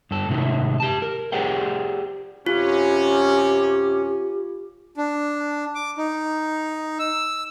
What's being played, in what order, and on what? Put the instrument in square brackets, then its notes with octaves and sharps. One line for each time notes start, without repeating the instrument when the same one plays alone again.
[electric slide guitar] G2 A4
G#2 C3 D#3 F#3 A3
G4 A5
A#4
G4 G#4 C5 D5 F#5 G5
[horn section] F#2 C3 C#4 [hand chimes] F4 [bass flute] G4
[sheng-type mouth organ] D4
D6
D#4
E6